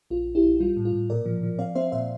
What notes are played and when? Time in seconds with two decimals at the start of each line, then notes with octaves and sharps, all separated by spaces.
0.10 A#1 F4
0.27 A#1
0.35 E4 G4
0.44 A#1
0.60 G3 F4
0.77 A2
0.85 F4
0.93 A2
1.10 A#2 A#4 D5
1.26 F3
1.43 F3
1.59 C4 D5 F5
1.75 C4 C5 E5
1.92 A#2 C5 E5